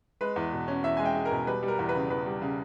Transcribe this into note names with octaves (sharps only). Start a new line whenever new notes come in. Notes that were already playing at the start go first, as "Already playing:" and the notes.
G#3 B4
E2
B2
C#4
E2 E5
G#3 G#5
G5
G#3
A#4
B2
G3 B4
G3
A#4
E2
B4
C#3
E2 B4
G3
C#3